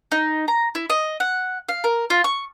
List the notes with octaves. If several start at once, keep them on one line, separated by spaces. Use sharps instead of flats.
D#4
A#5
E4
D#5
F#5
F5
A#4
F4
C#6